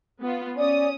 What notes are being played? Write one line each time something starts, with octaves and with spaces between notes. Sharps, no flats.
B3 F4
C#4 D5 D#6